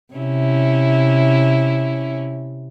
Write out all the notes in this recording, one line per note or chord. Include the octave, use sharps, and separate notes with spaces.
C3 C#4 E4